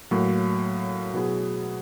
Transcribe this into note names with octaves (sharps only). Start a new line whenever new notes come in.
A2 F#3 A#3
B2 F#3 B3 E4 G#4